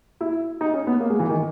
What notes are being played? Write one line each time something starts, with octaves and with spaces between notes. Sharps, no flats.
E4
D#4
C#4
B3
A#3
G#3
E3
D#3